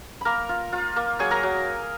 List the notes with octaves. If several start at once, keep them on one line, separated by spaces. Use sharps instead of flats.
A#3 A#4 A#5 B5
F4
F4
A#3
F#3 G#4 G#5
A#4 A#5
F#3